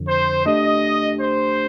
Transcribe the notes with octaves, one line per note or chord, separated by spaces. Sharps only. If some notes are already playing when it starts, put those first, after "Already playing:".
Already playing: F2 D3 F3
C5
A3 D4 G4 D#5
C5